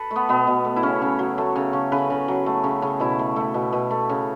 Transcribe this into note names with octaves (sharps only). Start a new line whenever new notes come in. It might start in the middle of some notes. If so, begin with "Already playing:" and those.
Already playing: A4 B4
A3
B3
B2 B3
B2
A3
E4
C#3 C#4
C#3
F#3
A3
C#3
C#3
C#3 B4
C#3
F#3
A3
C#3
C#3
B2 E4
A3
A3
B2
B2
A3
C#3